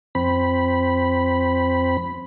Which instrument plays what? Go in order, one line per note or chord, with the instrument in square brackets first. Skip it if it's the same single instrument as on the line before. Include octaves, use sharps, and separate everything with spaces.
[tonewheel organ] F2 C4 B5